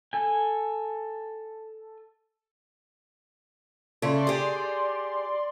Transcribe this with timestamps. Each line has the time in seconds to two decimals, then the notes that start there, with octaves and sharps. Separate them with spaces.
0.13 A4 G#5
4.02 C#3 E4 A4 D5 C6
4.27 G4 G#4